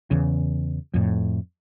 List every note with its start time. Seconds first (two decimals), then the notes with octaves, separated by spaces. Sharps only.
0.11 E2 C#3
0.94 F2 A2